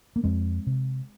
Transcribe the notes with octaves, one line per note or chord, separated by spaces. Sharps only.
A#3
F2 G#3 C4
C3